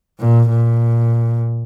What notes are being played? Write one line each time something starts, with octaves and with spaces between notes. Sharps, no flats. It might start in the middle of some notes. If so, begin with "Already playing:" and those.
A#2
A#2